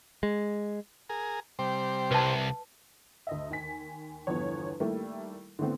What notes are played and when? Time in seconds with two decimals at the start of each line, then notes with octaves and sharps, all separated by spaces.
0.23 G#3
1.09 G#4 A#4
1.59 C3 G3 C5
2.11 C2 B4 A5
3.27 D2 D#5 E5
3.50 D#2 G#5 B6
4.27 G1 E2 F3 B3 C#5
4.80 D#3 G3 A3 A#3 E4
5.59 D3 E3 A3 B3 C4